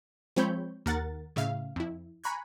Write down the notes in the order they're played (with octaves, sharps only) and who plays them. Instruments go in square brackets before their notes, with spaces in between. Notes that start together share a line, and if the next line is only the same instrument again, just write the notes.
[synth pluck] F3 G#3 C4 C#5 B5 G6
D#2 A#4 F#5 A6
A2 C#3 E5 F5
F2 E4
G#5 A#5 B5 C#6 F#6 G#6